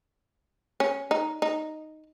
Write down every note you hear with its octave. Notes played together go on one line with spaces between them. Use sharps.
C#4
D#4
D#4